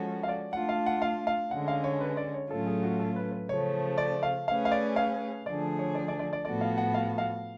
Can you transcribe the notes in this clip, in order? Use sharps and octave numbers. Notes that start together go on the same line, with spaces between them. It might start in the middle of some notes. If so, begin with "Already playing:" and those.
Already playing: F3 G#3 C#4 F#4 A4
F5
D5
A3 D4 F4 F#5
F5
F#5
F5
F5
D3 G#3 C#4 F#5
F5
C#5
B4
D5
C#5
A2 F#3 A3 C#4 F4 A4
G#4
F#4
A4
B4
B4
C#3 F3 A3 C#5
D5
F5
A3 C#4 G#4 B4 F5
F5
D5
F5
D3 F3 A3 D4 G#4 D5
C#5
D5
D5
D5
D5
A2 F3 B3 F#4 A4 D5
F5
F#5
F5
F5